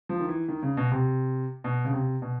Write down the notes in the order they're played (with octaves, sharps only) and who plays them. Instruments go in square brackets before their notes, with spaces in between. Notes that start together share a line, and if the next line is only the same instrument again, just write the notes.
[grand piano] F3
D#3
E3
D#3
C#3
B2
C3
B2
C#3
C3
B2